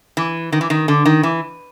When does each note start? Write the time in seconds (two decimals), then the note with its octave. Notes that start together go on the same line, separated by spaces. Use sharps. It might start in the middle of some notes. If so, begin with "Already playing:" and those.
0.17 E3
0.52 D#3
0.61 E3
0.70 D#3
0.88 D3
1.05 D#3
1.23 E3